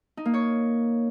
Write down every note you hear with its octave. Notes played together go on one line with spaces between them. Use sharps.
D#4
A#3
C#5